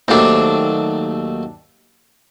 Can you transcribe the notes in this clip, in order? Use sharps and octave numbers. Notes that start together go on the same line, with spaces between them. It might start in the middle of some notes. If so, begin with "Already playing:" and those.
D#2 F#3 A3 C4 D4